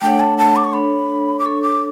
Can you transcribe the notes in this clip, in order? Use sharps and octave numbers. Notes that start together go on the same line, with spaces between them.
A3 D4 A4 C#5 F#5 G5
A5
A5
D6
C#6
D4 A4 C#5 B5
D6
D4 A4 C#5 C#6
D6